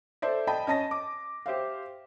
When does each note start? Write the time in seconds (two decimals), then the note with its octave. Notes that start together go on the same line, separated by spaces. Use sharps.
0.22 A4 C5 D5 E5
0.47 D#5 G5 A5 B5
0.67 C#4 D#5 A5 A#6
0.91 D6
1.46 G4 C5 E5 F5